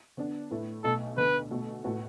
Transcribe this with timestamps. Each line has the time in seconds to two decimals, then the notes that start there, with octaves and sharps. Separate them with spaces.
0.17 D3 B3 D4
0.51 A2 A3 E4 B4
0.84 B1 B2 A3 A4
1.17 D2 D3 B3 B4
1.51 B2 A3 F#4 A4
1.84 A2 A3 F#4 B4